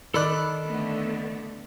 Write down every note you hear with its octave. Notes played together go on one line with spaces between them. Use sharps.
D#3 A4 D5 B5 F#6
D3 A3 B3